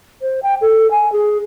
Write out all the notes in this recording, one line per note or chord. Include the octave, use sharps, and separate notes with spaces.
C5
G5
A4
G#5
G#4